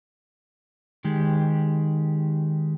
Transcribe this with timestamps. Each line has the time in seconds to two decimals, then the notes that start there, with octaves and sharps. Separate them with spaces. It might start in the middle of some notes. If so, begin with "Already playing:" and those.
1.05 D#3 G#3 G4